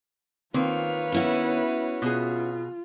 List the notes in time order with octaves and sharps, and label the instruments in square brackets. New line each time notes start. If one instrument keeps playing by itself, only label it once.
[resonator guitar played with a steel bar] D#3 A#3 C4 [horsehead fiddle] F4 F5 [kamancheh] B4 C#5
[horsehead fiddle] B3 [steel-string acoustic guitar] C#4 E4 F#4
[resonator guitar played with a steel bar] B2 G#4 [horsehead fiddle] F4